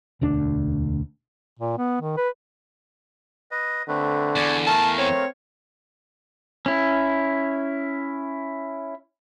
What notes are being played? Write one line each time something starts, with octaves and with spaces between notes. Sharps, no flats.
E1 D2 D4
A#2
B3
D#3
B4
B4 D#5
D3 A3 C4 B4
E2 D5 G#5 C#6
A3 A#4 F5 A5
C4 C#5
C#4 E4